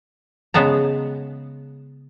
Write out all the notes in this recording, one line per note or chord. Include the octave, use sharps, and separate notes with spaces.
C#3 G#3 B3 A5 A#5